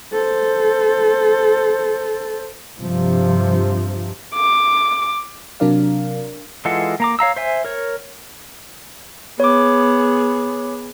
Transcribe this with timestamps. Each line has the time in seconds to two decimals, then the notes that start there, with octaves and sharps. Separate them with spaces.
0.13 A4 C5
2.79 G2 C3 F3
4.35 D6
5.60 C3 F#3 D4 A#4 D5 F5
6.65 E3 G#3 F4 A4 F#5
7.00 A#3 A#5 D6
7.19 C#5 F5 A#5 E6
7.36 C5 E5 G#5
7.65 A#4 C#5
9.40 B3 G#4 C#5 D6